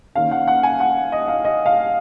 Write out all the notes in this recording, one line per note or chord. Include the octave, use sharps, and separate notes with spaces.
D#3 A#3 C#4 F5
F#5
F#5
G#5
F#5
D#5
F5
D#5
F5